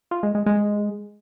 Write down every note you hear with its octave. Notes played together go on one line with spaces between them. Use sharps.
F4
G#3
G#3
G#3